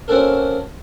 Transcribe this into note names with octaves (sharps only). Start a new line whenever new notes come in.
A#3 C4 C#4 F#4 A4 A#4